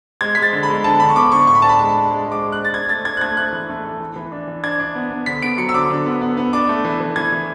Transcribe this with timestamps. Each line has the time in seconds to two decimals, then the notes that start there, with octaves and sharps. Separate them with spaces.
0.21 G#3 G#6
0.35 G#3 B6
0.42 A6
0.53 D3
0.63 B5
0.68 G#3
0.84 D3 A5
1.00 D3 B5
1.09 C#6
1.16 B3 D6
1.32 D3 C#6
1.47 A2 C#6
1.55 B5
1.62 D4 A5
1.69 B5
1.79 G#3 A5
1.95 D4
2.11 G#3
2.26 G#3
2.32 D6
2.42 G#3
2.52 F#6
2.58 D4
2.65 A6
2.74 D4 G#6
2.89 A3 A6
3.05 D4 G#6
3.17 F#6
3.21 A3 G#6
3.36 A3 F#6
3.53 E3
3.69 A3
3.84 A3
4.00 E3
4.16 E3
4.32 D4
4.47 E3
4.63 D4 G#6
4.80 D4
4.95 B3
5.11 B3
5.26 D3 B6
5.42 B3 D7
5.58 F#3 C#7
5.69 E6
5.74 D3 D6
5.90 D3
6.06 B3
6.21 B3
6.37 B3
6.53 D4 D6
6.69 A3
6.85 E3
7.00 E3
7.16 E3 G#6
7.32 E3